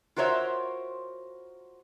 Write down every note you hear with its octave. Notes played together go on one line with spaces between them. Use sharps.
F4 F#4 A#4 C5 C#5 E5